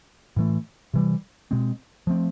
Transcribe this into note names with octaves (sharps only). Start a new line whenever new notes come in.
A2 E3 A3
C3 E3 G3
B2 G#3 C4
F3 A3 C4